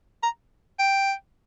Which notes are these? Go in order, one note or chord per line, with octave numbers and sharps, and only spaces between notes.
A#5
G5